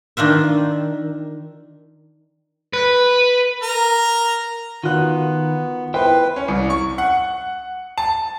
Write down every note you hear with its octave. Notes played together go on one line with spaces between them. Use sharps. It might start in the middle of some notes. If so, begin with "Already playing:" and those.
D#3 D4 F4 E5
B4
A#4 A#5
D#3 B3 F4 F#4 F#6
E4 B4 C5 G5
C#4
C2
C#6
F#5
A5